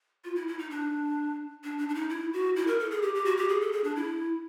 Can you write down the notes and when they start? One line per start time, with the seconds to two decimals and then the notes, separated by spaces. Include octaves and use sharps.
0.24 F4
0.36 E4
0.48 E4
0.59 D#4
0.70 D4
1.64 D4
1.79 D4
1.89 D4
1.95 D#4
2.09 E4
2.33 F#4
2.56 E4
2.67 A#4
2.80 A4
2.91 G#4
3.02 G4
3.15 G4
3.25 F#4
3.37 G4
3.49 G#4
3.61 A4
3.72 G#4
3.84 D4
3.96 E4